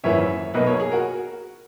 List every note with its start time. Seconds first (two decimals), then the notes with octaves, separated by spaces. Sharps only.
0.04 G#1 F#2 E3 A#3 C#5 E5
0.54 B1 B2 A#3 B4 D#5
0.67 A#4 C#5
0.80 G#4
0.92 F#4 A#4